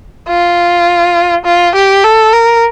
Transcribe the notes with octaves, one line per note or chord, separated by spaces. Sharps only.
F4
F4
G4
A4
A#4